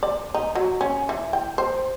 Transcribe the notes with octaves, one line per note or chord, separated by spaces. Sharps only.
D5
D#4
F#3
C#4
E3
G5
C5